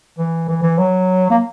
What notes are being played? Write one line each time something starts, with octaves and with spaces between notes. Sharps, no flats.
E3
E3
E3
F#3
A#3